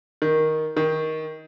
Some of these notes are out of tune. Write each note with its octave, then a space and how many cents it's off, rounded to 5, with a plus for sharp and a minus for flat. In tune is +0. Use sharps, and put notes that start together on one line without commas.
D#3 +10
D#3 +20